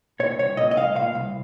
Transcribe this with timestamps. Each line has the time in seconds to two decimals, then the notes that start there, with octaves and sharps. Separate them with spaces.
0.20 A#2 C#5
0.39 C2 C#5
0.57 A#2 D#5
0.71 D#5
0.77 C2 F5
0.96 A#2 F5
1.15 C2